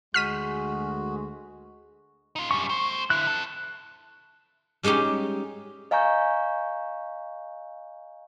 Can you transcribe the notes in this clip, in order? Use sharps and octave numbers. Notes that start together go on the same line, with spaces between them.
D2 G#3 F#4 G#4 F6 B6 D#7
D#4 F4
F#2 G3 C#6
A3 C5
D3 E4 F#6
C4 A4
G3 G#3 C#4 D#4 G4
D#5 F5 G#5 A#5 C#6 G6